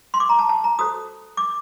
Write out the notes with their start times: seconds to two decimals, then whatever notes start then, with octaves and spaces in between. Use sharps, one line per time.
0.14 C6
0.20 D6
0.29 A#5
0.39 A5
0.49 A5
0.64 A#5
0.79 F#4 A4 C5 D#6
1.37 D6